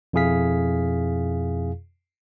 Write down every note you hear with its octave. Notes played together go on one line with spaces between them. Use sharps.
F2 B2 E4 G#4 F5 B6